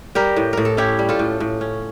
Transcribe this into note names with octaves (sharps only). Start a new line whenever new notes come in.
G3 G4 A#4
A2
A2 A#4
A4
C#4 E4 G4
G3
F4 A4
A2
A2
C#4